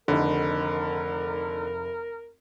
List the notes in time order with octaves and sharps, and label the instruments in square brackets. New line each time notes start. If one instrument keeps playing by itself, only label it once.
[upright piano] F1 D#3 D#4 [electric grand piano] D3 [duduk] A#4